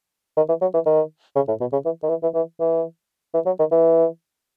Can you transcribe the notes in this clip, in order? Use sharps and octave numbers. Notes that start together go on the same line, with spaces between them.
D#3
E3
F#3
E3
D#3
C#3
A2
B2
C#3
E3
D#3
E3
E3
E3
E3
E3
F#3
D#3
E3